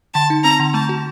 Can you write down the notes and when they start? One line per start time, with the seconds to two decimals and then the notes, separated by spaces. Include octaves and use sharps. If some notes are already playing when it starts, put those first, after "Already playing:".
0.14 D3 A5
0.30 D#4
0.44 C4 A#5
0.59 D3
0.74 A3 A5
0.89 F#4